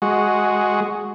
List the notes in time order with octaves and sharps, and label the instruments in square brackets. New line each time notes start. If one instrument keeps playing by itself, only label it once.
[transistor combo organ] G#3 F#4